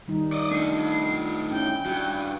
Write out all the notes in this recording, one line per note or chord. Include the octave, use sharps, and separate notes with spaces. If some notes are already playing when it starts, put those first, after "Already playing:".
D#3 G3 D#4
D5 D#5
A3 D4 D#4 C7
C#4 E4 G5
G2 F#4